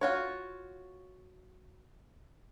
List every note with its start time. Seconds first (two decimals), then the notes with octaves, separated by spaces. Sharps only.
0.01 F4 F#4 C#5